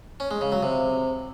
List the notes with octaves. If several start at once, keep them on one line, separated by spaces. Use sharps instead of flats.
C#4
G#3
C#3
F#3
C3